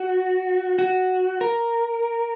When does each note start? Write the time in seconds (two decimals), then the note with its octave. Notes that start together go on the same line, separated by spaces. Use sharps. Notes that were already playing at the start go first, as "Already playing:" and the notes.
Already playing: F#4
0.79 F#4
1.41 A#4